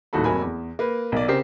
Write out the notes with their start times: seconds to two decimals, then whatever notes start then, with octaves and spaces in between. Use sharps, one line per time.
0.13 D#1 A2 D#3 F#4 A4 B5
0.24 F1 F2 F#3 A#4 G#5 B5
0.42 E2
0.79 A#3 B4
1.12 B1 A#4 D5
1.28 C#3 C4 G4 A#4 C7